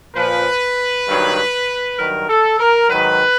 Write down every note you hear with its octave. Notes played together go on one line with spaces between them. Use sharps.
A#2 F3 B4
G2 D#3 F#3
G2 D#3 F#3 A#4
A4
A#4
G#2 D#3 F#3 B4